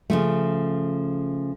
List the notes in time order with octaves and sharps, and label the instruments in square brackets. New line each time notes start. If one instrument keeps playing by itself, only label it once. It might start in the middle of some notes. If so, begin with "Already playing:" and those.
[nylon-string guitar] C#3 F3 A3